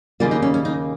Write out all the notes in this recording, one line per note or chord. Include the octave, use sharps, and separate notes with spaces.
D#2 C#3 G3 A#3 F4
D#4
C#4
C#4
D#4